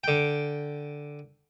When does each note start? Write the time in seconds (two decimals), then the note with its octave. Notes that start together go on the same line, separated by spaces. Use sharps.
0.04 D3 G5